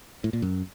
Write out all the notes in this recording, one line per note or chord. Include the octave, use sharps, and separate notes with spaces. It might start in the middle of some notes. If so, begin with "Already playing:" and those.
A2
A#2
F#2